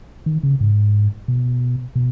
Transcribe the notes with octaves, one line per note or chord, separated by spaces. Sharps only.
D#3
C#3
G#2
B2
B2